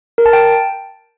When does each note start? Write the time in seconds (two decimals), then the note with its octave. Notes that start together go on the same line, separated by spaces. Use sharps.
0.18 A#4
0.26 A5
0.33 G5